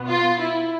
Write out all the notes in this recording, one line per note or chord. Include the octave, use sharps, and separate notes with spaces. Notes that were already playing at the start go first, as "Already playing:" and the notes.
Already playing: B2 B3
F4
E4